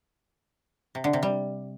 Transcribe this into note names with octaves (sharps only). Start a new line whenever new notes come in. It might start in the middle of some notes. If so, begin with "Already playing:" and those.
C3
D3
C3
G3